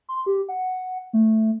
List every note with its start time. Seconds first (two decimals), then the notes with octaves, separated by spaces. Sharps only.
0.09 C6
0.26 G4
0.49 F#5
1.13 A3